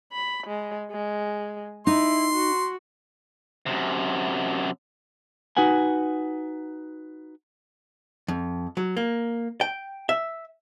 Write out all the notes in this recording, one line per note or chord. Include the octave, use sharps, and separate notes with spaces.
B5
G#3
G#3
D#4 E4 C6
F#4
F#2 C3
D#4 F#4 B4 F#5 G#5
F2
F#3
A#3
G5
E5